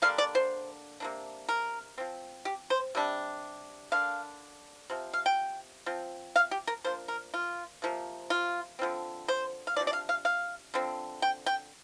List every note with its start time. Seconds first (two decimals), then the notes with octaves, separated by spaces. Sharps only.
0.02 D3 G3 A#3 D4 F5
0.18 D5
0.35 C5
1.00 C3 A#3 D4
1.49 A#4
1.98 F3 C4
2.45 G4
2.70 C5
2.95 C3 G3 D4
3.92 D3 A#3 D4 F5
4.90 C3 F3
5.13 F5
5.26 G5
5.86 F3 C4
6.36 F5
6.51 G4
6.67 A#4
6.84 F3 A#3 D4 C5
7.08 A#4
7.34 F4
7.82 C3 F3 A#3
8.30 F4
8.79 D3 F3 C4
9.28 C5
9.67 F5
9.76 C3 F3 A#3 D4 D5
9.87 D5
9.93 F5
10.09 F5
10.25 F5
10.74 D3 F3 C4
11.22 G5
11.46 G5